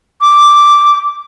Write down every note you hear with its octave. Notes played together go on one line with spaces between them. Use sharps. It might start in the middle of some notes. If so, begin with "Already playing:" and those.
D6